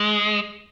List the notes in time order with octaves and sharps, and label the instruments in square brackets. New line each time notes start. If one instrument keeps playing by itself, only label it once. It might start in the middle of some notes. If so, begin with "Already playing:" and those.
Already playing: [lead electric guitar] G#3